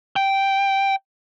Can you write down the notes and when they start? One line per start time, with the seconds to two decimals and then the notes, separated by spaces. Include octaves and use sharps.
0.16 G5